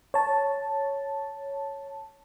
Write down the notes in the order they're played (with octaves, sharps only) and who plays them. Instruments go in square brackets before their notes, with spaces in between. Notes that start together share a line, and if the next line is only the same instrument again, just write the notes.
[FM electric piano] C#5 A5